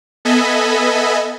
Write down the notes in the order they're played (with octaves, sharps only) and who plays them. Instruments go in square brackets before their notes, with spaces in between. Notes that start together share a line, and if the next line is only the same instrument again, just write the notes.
[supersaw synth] B3 A4 D#5 E5 G#5 B5